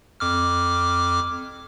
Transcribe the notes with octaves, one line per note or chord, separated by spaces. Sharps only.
F2 D6 F6